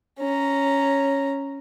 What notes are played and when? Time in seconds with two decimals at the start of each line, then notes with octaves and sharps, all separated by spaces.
0.20 C#4 A#5